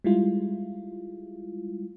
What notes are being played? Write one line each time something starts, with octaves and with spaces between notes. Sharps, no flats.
G3 G#3 E4 F4